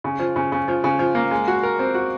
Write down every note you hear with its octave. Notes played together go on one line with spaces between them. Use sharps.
C#3
F3
C#3
C#3
F3
C#3
F3
A#3
G#3
F#4
A#4
C4
F#4